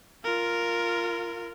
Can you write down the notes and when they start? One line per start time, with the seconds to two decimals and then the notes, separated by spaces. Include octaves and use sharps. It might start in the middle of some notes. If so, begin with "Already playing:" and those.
0.24 F4 A#4